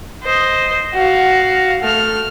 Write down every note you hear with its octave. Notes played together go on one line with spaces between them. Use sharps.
C5 D#5
F#4 F5
A3 F6